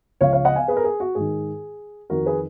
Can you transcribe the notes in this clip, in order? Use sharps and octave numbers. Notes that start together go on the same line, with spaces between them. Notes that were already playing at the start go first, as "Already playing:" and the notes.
C#2 C#3 F3 C#5 F5
C#5 F5
D#5 F#5
F5 G#5
G#4 B4
A#4
G#4
F#4
G#2 D#3 G#4
F2 D#3 F#4 A#4
G#4 B4